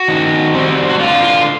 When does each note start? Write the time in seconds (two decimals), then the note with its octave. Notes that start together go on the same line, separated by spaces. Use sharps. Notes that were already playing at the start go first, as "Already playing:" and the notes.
Already playing: F#4
0.08 D#3
0.54 G3 C4
0.90 F#4
1.00 D3 F4
1.23 F4